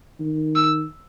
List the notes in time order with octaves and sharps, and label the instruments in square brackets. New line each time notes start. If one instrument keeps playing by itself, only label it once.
[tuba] D#3
[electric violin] E6